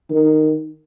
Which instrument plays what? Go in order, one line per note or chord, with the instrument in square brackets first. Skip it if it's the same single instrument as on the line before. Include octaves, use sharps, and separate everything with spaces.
[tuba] D#3